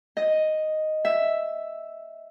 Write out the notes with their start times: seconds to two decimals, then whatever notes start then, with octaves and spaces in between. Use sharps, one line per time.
0.17 D#5
1.05 E5